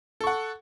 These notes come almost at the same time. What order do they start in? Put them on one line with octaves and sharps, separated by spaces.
A4 C#6 F#5